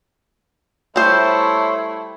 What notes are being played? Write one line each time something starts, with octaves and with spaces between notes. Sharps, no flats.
G3 A3 E4 C5 C#5 C6 E6